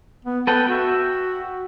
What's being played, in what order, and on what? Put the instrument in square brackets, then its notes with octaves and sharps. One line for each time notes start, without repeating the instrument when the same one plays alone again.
[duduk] B3
[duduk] B3 [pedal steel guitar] A4 B4 G5
[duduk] F#4 [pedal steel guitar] E5 G5